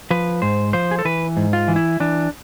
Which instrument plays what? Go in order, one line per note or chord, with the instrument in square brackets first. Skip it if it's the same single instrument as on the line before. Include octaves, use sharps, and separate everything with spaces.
[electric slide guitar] F3 B4
G#2 C5
F3 C5
G#4
A4
E3 B4
G#2
F4
E3
E4
E3 D4